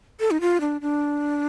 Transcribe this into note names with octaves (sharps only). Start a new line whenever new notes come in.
A4
D#4
F4
D4
D4